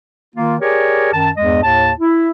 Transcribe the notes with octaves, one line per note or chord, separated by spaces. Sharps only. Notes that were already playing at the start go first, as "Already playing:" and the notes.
D#3 A#3 F4
G4 G#4 A#4 C#5 D5
F#2 D#3 A5
E2 G2 G#3 D#5
D#2 A2 A5
E4